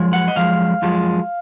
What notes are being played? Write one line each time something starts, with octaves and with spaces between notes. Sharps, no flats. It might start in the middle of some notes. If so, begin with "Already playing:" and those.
Already playing: F#2 F3 G#3
F#5
D#5
F#2 F3 G#3 F5
F#2 F3 G#3